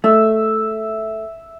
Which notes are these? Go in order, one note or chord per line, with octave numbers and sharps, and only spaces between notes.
A3 E5